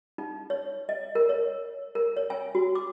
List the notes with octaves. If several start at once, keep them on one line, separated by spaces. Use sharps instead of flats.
D#4
C#5
D#5
A#4
C#5
A#4
C#5
G#5
F#4
D6